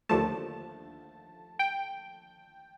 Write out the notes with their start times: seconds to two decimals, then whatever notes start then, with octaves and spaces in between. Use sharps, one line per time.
0.09 D#2 D3 F3 A3 A5
1.59 G5